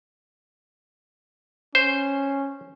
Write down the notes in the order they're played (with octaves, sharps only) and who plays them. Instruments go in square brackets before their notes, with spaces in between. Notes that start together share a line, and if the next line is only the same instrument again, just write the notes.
[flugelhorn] C#4 [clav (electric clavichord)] C5